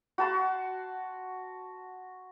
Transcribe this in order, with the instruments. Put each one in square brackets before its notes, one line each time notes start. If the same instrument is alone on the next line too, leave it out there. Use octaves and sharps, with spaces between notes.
[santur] F#4 A5 C6